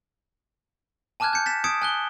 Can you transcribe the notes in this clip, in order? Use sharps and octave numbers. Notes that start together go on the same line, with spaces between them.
G#5 A5 D6 F6 F#6 G#6
G6 C#7
A6 B6 E7
D#6 G#6 C#7 D7 E7
G#5 F#6 G7